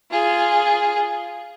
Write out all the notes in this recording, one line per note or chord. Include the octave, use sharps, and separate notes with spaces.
F4 G#4